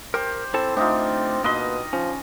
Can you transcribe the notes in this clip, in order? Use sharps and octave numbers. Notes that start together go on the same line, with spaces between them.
G4 A#4 C5
C4 E4 A4 A5
A3 C4 D4 D#4 F4
B2 A#3 B4 D#5 C6
F3 C#4